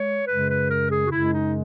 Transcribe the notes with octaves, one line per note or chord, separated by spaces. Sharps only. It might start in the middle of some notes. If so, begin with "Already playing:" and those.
Already playing: G#3 C#5
F#2 C#3 G#3 B4
B4
A#4
G#4
F#4
F#2 C#3 G#3 E4
D#4